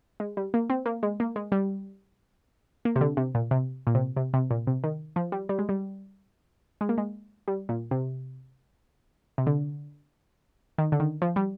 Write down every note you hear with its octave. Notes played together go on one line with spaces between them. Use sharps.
G#3
G3
A#3
C4
A#3
G#3
A#3
G#3
G3
A#3
C3
D3
C3
A#2
C3
A#2
C3
C3
C3
A#2
C3
D#3
F3
G3
G3
G#3
G3
G#3
A#3
G#3
G3
A#2
C3
C3
D3
D#3
D3
D#3
F3
G3